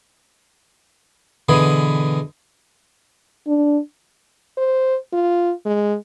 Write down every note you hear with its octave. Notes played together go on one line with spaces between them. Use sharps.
B2 D3 E3 G#4
D4
C5
F4
G#3